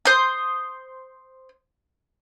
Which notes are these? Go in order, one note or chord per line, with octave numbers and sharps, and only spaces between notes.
C5 D#6